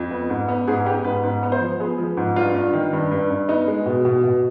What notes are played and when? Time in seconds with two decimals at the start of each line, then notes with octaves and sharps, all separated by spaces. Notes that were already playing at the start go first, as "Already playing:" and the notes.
Already playing: F2
0.11 B3
0.30 G#2
0.48 B3
0.67 G#2 G#4
0.86 B3 G4
1.04 G#2 B4
1.24 G#2 B4
1.43 B3
1.52 C5
1.61 F3
1.80 B3 G#4
1.98 F3
2.17 G#2
2.36 G2 F4
2.55 G2
2.73 D#3
2.93 G2
3.11 G2
3.30 G2
3.49 B3 D#4
3.68 G#3
3.86 B2
4.05 B2
4.24 B2